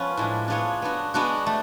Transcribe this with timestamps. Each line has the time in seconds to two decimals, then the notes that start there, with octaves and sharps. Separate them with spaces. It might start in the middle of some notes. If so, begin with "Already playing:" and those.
Already playing: F3 B3 C#4 F4 B4
0.17 A2 G#3 D4
0.48 B3 D4 F4 G#4 C#5
0.82 B3 D4 F#4
1.14 G#3 B3 D4 F#4
1.46 A3